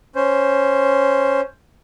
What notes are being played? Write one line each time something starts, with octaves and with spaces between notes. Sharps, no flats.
C#4 C5